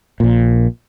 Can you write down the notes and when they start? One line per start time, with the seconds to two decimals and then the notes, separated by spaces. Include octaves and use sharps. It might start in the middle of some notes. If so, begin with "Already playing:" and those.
0.20 A#1 A#2